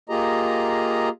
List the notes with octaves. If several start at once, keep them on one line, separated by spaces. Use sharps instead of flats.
A#3 F4 G4 G#4 D#5 A#5